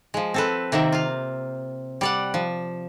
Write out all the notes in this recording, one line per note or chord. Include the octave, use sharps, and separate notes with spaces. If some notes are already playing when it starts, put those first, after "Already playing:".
F3 G#3
C4 A4 B4
C3 D#3 A#3 C4 E5
F4 F5
G3 D5 F#5
F3